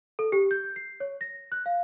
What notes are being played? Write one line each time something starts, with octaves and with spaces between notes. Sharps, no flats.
A4
G4
G6
C7
C#5
A#6
F#6
F5